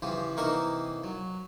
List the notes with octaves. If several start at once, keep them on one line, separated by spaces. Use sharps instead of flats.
C#3 E3 F3 G4
C3 E3 A#3 D#4 A#4 C#6
F#3